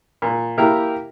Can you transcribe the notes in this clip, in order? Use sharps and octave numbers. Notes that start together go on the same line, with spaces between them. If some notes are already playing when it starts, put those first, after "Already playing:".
A#2
A#3 E4 G4 A#4